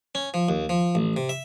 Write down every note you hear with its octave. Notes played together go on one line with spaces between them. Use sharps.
C#4
F3
D#2
F3
A1
C3
E5